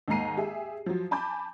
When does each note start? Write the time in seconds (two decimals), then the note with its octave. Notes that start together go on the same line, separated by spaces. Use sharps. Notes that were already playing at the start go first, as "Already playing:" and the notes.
0.08 D#2 G#2 A#3 A#5 C7 D#7
0.37 G4 G#4 E5
0.86 F3 F#3
1.11 G#5 A5 B5 D6 G6